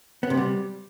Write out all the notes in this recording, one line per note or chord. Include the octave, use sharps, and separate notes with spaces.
B3
C3
G3